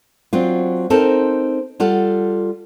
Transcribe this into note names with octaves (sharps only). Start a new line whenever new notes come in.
F#3 C4 D4 F4
C4 D#4 A4 A#4 C5
G3 F4 A4 F#5